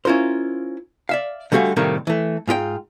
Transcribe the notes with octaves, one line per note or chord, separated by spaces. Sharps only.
C#4 E4 F4 A#4 C5
D5 E5 F5
D3 G3 A3 F#4 F5 G#5
A2 C3 D#3 G3 A3 A#3
E3 A3
G#2 F4 F#4 G5